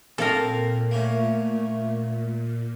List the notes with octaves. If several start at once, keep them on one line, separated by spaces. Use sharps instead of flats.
A#2 A#3 C4 A4 A#4 F5
A3 A#3 C#4